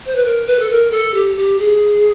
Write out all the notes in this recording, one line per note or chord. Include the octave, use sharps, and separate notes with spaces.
C5
B4
A#4
B4
A4
A#4
A4
G4
G4
G#4